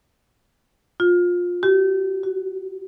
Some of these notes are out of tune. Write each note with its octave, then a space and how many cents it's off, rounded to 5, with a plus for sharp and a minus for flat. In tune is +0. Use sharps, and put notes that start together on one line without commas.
F4 +20
G4 -35
F#4 +15